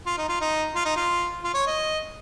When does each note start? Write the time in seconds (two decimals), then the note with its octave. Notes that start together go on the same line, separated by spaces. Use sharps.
0.06 F4
0.18 D#4
0.29 F4
0.41 D#4
0.75 F4
0.85 D#4
0.96 F4
1.44 F4
1.54 C#5
1.67 D#5